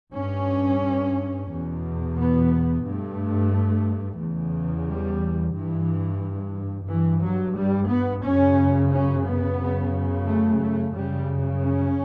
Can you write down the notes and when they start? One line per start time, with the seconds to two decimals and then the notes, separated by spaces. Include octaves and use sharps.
0.15 G2 C#4
1.50 E2 B2
2.18 B3
2.85 G2 A3
4.19 E2 C#3
4.87 G3
5.55 G2 E3
6.89 G2 E3
7.24 F#3
7.57 G3
7.90 B3
8.24 F#2 C#3 C#4
8.91 C#4
9.25 B3
9.59 F#2 C#3
10.26 A3
10.60 A3
10.94 F#2 C#3 G3
11.61 C#4